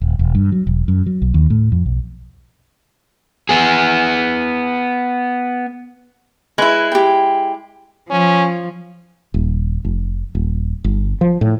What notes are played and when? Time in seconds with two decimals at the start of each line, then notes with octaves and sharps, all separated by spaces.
0.02 D#1
0.19 E1
0.35 G2
0.52 F#3
0.67 E1
0.88 F#2
1.06 F#3
1.22 B1
1.34 D#2
1.50 A2
1.72 F2
1.86 B1
3.49 B3 G#4
6.58 G#3 E4 B4
6.92 G4 G5
8.10 F3 C#4
9.34 D#1
9.85 F1
10.35 D#1
10.84 G1
11.21 F3
11.41 A2